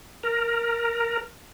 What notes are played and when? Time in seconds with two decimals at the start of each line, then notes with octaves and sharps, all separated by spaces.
0.23 A#4